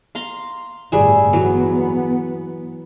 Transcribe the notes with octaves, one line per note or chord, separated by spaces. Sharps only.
F5 A#5 C6
G1 A2 G3 G#4 E5
E3 F#3 B3